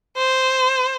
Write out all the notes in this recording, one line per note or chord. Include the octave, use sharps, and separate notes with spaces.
C5